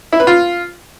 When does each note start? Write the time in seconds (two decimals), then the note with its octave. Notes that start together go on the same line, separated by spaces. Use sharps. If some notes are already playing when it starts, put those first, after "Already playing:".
0.13 E4
0.20 B4
0.27 F4